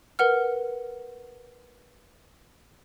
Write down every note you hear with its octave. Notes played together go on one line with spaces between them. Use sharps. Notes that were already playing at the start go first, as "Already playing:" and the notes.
A#4 B4 F#5 F6